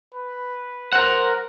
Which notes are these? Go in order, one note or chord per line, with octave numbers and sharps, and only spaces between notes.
B4
A#4 C5 F#5